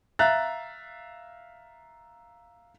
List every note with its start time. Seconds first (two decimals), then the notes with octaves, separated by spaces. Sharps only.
0.19 E5 F5 A#5 F#6 A6